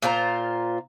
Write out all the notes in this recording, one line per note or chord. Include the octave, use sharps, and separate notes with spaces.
A#2 F4 C5 A#5